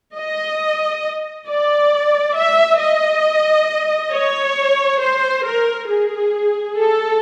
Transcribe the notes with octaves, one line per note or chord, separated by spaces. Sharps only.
D#5
D5
E5
D#5
C#5
C5
A#4
G#4
A4